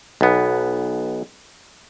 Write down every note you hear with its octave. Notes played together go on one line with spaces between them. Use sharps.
B1 B3